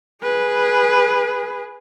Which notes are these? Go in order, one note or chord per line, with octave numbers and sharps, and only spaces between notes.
G#4 B4